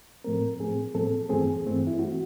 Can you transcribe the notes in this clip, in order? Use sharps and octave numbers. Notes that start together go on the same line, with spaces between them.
A2 F3 A3 C4 A#4
A2 F3 A3 C4 G#4
A2 F3 A3 C4 A4
G2 E3 A3 C4 G#4
G2 E3 A3 C4
E4
E3 A3 C4 F#4